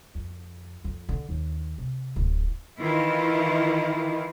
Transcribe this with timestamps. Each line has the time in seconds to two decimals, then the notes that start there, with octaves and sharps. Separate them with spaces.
0.15 F2
0.84 F2
1.09 D3
1.29 D#2
1.78 C3
2.16 D1
2.79 D#3 E3 E4 F4